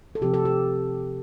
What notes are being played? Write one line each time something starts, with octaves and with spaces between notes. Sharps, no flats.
A4
C3 F3 C4 G4
A4
G4